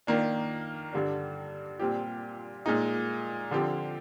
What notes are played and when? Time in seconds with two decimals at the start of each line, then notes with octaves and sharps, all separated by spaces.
0.07 D#3 A#3 D4
0.93 G2 D3 G3 D4
1.79 A#2 G3 C4 G4
2.66 A#2 G#3 D#4
3.51 D3 F3 C4 G4